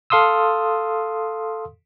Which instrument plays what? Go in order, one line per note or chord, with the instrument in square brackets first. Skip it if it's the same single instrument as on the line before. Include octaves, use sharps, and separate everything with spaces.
[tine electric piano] A4 F5 C6 D#6 E6